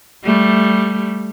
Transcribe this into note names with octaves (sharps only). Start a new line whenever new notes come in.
G3 A3